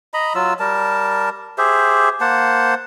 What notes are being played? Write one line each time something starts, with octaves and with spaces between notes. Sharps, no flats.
D#5 A#5 B5
F#3 F4 E6
G3 A#4 A5
G4 G#4 C5 E5
A#3 C5 F#5 A5